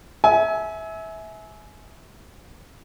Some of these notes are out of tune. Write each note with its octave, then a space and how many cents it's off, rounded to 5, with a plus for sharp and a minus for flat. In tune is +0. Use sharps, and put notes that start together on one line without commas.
E5 -20 G#5 +25